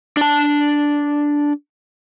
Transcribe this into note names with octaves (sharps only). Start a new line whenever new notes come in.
D4 A5